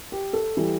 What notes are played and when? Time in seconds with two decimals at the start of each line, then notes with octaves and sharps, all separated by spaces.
0.12 G4
0.33 A4
0.57 E3 G3